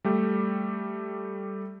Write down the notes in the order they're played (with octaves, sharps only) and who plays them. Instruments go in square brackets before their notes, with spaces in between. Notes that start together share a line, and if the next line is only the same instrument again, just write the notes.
[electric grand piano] G3 A3 G4